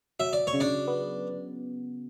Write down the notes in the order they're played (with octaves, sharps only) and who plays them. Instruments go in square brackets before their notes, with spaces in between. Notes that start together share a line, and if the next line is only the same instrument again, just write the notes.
[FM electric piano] F#3 [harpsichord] E5
[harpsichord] D5
C#5
[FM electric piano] C#3
[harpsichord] D4 D5
[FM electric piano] B3